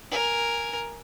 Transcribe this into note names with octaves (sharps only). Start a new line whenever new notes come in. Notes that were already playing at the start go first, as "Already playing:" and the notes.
A#4 G#5